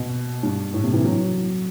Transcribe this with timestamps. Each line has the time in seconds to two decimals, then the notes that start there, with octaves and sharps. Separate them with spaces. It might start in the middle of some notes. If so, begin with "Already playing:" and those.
Already playing: B2
0.43 G2
0.74 A2
0.84 C3
0.94 E3
1.04 F#3